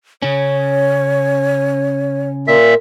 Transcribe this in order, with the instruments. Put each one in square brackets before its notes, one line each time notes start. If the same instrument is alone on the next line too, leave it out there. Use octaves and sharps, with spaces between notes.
[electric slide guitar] C#3 C#4 [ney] C#5
[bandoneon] A#2 E5 [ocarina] A#4